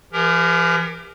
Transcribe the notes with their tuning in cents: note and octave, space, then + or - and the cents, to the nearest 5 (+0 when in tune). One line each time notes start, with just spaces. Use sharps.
E3 +45 G4 +40 A#4 +0